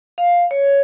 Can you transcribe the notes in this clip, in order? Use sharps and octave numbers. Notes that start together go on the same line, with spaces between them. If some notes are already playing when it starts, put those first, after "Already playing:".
F5
C#5